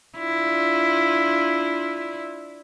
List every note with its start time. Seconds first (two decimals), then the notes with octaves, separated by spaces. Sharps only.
0.18 D4 E4 F4